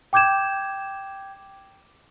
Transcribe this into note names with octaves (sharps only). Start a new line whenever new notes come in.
G5 D6 G6 G#6 E7